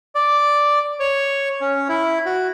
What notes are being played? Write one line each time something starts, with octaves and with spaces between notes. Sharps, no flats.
D5
C#5
C#4
E4
F#4